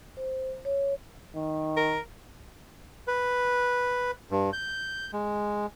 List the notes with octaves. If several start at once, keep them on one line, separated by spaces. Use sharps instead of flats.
C5
C#5
D#3
A#4
B4
G2
G6
G#3